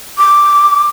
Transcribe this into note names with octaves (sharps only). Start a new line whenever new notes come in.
D6